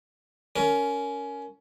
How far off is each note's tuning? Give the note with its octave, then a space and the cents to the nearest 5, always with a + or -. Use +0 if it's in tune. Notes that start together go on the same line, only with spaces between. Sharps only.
C#4 +20 A#4 -5